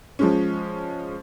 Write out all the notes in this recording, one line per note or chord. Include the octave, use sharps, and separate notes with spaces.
F3 G#3 C#4